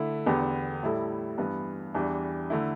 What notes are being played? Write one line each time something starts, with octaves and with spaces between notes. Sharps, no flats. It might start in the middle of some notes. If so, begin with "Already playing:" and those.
Already playing: D3 A3 E4
E2 D3 B3 G4
A2 G3 E4 A4
G2 E3 B3
E2 E3 G3 D4
D3 A3 E4